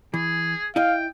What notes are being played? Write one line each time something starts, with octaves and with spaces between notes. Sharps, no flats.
E3 G#4
E4 D#5 F5 G5